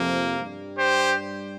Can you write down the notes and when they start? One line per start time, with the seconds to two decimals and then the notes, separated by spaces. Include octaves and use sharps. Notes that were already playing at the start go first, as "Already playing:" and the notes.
Already playing: F2 C3 F3 A#3
0.40 G2 G3
0.76 G4 C5